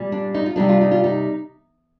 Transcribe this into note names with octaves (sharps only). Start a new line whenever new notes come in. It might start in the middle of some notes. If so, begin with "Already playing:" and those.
Already playing: A#2 G3
D4
D#4
F4
C3 G3 D4 D#4
F4
D#4
F4
D#4